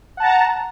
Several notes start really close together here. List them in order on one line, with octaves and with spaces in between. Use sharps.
F#5 A5 A#5